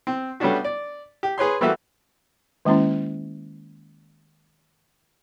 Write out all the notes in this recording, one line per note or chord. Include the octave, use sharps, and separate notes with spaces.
C4
G3 A3 B3 C#4 D4 F#4
D5
G4
G#4 B4 C#5 C6
E3 G3 A3 A#3 F#4 E5
D#3 G#3 A#3 C#4 E4